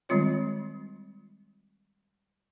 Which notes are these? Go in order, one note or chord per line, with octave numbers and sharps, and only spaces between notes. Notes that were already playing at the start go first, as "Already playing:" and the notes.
D#3 G3 G#3 C4 F4 C#5